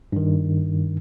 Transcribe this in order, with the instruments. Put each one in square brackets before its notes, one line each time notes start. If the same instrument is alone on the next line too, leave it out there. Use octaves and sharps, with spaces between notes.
[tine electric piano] G2 D#3